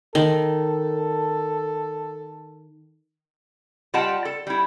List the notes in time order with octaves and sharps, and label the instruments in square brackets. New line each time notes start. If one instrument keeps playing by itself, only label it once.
[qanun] D#3 [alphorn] A4
[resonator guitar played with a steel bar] G3 F4 D#5 F#5 G5 A5
A4
G3 E4